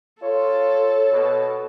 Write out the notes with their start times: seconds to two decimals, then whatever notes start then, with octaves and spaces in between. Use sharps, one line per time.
0.22 F4 A4 C#5
1.12 B2